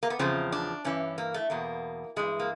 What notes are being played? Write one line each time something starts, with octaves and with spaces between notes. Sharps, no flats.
A#3
B3
E2 C#3 F3 C4
D4
G2 E3 C#4
A#3
A3
E2 B2 A#3
G2 E3 G#3
A#3